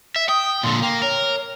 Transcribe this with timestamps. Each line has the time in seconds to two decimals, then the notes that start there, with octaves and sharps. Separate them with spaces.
0.16 E5
0.29 G5 D#6
0.63 A#2 D3 C6
0.82 A#3 G5
1.02 A#4 C#5